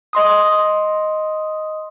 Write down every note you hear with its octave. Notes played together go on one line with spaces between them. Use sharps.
D#5 C6 D#6